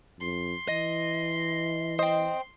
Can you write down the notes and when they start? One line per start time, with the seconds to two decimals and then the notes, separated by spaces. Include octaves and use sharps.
0.20 F2 C6
0.69 E3 D#5
1.99 C5 D#5 G5